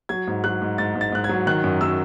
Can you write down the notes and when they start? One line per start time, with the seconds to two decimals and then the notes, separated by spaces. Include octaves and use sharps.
0.09 F#3 G#6
0.27 G#2
0.44 F#3 F#6
0.61 G#2
0.78 G#2 A6
0.95 G#2
1.01 A6
1.12 G#2 F#6
1.24 G#6
1.29 F#3
1.47 D#3 F#6
1.64 F#2
1.81 F#3 E6